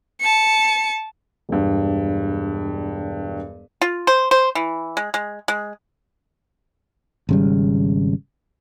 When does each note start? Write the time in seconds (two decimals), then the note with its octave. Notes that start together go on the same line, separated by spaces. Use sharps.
0.21 A5 C#7
1.49 E1 G2
3.81 F4
4.07 C5
4.31 C5
4.55 E3
4.97 G#3
5.14 G#3
5.48 G#3
7.29 G#1 C#3 G3